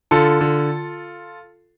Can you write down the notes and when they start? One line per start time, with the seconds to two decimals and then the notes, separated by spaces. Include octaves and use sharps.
0.11 D3 F4 A4
0.41 D3